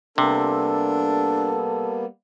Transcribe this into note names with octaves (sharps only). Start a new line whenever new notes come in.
C3 G3 A#3 B3 D4 A4